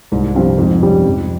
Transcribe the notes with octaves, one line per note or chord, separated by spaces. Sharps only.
C2 G#2
G2 C3 F3 C4 F4
F2 G#2
C3 G3 C#4
F2